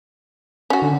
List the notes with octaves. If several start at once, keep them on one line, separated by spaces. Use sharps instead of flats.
C#4 F#4
D3